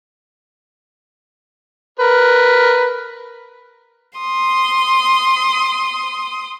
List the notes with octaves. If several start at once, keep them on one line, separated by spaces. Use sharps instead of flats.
A#4 B4
C6 D#6